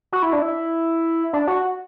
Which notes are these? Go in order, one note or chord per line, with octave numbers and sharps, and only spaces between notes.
F#4
E4
D4
E4
D4
F#4